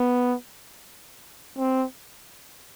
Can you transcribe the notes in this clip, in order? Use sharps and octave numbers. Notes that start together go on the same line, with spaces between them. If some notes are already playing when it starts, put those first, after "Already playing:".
Already playing: B3
C4